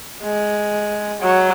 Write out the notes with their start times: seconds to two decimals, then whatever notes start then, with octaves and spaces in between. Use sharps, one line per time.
0.23 G#3
1.21 F#3